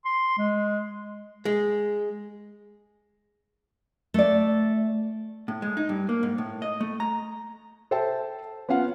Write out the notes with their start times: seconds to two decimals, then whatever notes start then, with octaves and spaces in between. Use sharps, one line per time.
0.05 C6
0.38 G#3
1.45 G#3
4.14 A3 D5
5.48 A2
5.62 G#3
5.77 D#4
5.89 G2
6.09 A#3
6.23 G#2
6.38 A2
6.62 D#5
6.80 A3
7.00 A#5
7.91 A4 C5 E5 G5 A5
8.69 B3 C#4 F4 F5 F#5